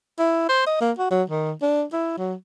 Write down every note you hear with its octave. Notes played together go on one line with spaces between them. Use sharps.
E4
C5
D#5
A#3
F#4
F#3
D#3
D4
E4
F#3